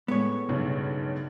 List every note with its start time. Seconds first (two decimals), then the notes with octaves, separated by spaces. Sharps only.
0.08 A2 G#3 A3 B3 C#5
0.49 B1 G2 C#3